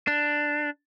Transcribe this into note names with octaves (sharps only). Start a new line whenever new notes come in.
D4